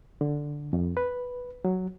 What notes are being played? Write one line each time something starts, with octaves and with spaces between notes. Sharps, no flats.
D3
F2
B4
F#3